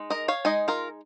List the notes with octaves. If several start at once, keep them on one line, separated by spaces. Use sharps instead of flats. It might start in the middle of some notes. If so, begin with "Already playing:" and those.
Already playing: G#3 D#4
A#4 D#5
C#5 F5
G#3 D#4 D#5 G#5
F4 A#4